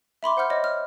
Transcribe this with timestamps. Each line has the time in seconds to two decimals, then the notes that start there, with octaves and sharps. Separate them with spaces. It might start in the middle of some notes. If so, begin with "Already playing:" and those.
0.23 E5 B5 C6 D6
0.37 C5 F#5 B5 F6 G6
0.50 C#5 D#5
0.64 F6